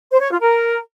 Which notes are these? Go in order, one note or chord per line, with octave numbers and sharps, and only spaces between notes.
C5
C#5
F4
A#4